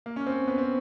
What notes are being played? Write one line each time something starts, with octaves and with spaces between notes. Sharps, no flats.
A#3
C#4
C4
B3
C4